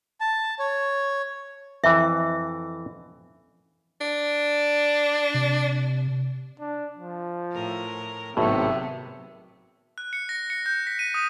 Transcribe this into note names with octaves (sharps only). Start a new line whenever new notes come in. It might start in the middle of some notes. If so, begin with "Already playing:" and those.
A5
C#5
F2 E3 E5
D4
C3
D4
F3
A2 A#4
G#1 A2 C3 F#3 B3 E5
F#6
C#7
A#6
C#7
G6
B6
D#7
D#6